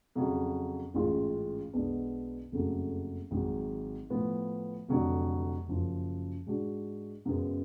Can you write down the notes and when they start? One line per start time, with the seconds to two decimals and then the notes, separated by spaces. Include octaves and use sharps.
0.15 F2 C#3 F#3
0.94 A1 G#2 G#3 C#4 F4
1.73 B1 B2 G#3 B3 D4
2.52 F#1 F2 C#3 F#3 A3
3.31 G#1 G#2 F#3
4.10 A2 F3 B3
4.88 F1 F2 D3 F#3
5.68 F#1 F#2 F3
6.46 G#2 G#3 D4 F#4
7.25 F#2 C#3 G#3 B3